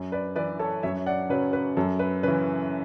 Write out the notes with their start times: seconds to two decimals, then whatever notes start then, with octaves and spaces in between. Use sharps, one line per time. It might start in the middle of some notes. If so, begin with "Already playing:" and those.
Already playing: F#2
0.12 B4 D5
0.36 E3 B4 D5
0.59 A4 C#5
0.83 F#2 C#5 E5
1.06 D5 F#5
1.29 C#3 F#3 B4
1.53 B4
1.77 F#2 A4
1.99 B4
2.23 C#3 E3 B4